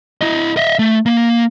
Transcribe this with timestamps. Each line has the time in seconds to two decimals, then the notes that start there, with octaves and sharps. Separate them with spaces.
0.21 E4 D#5
0.57 D#5 E5
0.79 A3
1.06 A#3